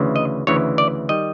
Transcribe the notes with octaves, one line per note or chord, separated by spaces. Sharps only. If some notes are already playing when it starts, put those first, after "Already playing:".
Already playing: D2 C#3 E3
D#5
D2 C#3 E3 C#5
D5
D#3 G3 D#5